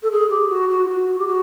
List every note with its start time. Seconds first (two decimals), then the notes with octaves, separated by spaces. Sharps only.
0.03 A4
0.11 G#4
0.30 G4
0.49 F#4
0.69 F#4
0.85 F4
0.89 F#4
1.18 G4
1.27 F#4